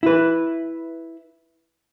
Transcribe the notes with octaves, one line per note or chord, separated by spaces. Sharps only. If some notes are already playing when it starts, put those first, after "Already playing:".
E4 B4